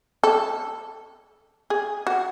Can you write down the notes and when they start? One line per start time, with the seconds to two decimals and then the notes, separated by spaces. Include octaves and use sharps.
0.24 A4
1.70 G#4
2.07 F#4